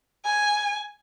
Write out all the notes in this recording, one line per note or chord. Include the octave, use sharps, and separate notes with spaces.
G#5